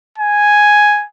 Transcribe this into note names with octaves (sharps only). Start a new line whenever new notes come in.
G#5